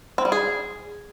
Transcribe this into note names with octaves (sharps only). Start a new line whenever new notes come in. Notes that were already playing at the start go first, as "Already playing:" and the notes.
C4
G3
G#4